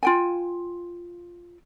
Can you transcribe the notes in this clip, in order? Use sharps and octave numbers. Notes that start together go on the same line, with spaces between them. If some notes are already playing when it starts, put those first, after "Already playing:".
F4 G5 G#5